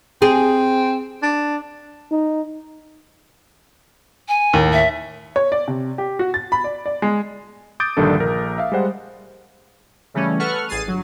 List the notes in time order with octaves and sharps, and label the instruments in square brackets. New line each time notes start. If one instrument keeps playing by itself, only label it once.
[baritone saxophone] C4 [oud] G#4
[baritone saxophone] D4
[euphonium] D#4
[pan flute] G#5
[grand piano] D#2 A2
[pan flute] E5
[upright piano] C#5
D5
C3
G4
F#4
A6
B5
D5
D5
G#3
[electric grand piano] D6 D#6 G6 A6 D7
A#1 G2 D3 D#3 D4 A4
A#1 A#4
E5 F5
G3 G#3 C5 F#5
[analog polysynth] C#3 E3 G3 A3 C#4
A4 B4 F#5 C#6 F6
A1 G#4 A6 C7 D#7
G1 F#3